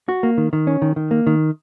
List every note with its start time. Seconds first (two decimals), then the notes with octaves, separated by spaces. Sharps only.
0.09 F#4
0.23 A#3
0.38 D#3
0.53 D#3
0.67 C#4
0.82 D#3
0.96 D#3
1.11 A#3
1.27 D#3